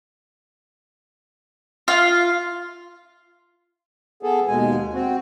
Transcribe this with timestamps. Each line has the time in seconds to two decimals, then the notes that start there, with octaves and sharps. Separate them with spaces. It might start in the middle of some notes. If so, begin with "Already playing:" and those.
1.88 F4
4.23 B3 G#4 A4
4.47 D#2 B2 G#3 G#5
4.93 C4 F#4